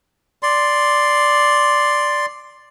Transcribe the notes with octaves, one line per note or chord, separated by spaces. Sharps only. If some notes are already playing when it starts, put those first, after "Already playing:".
D5 C6